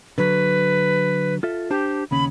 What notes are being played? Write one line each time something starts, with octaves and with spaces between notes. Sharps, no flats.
D3 F#3 B4
F4 A4 E5
D4 G4 C5 A5
D#2 C#3 C#4 B5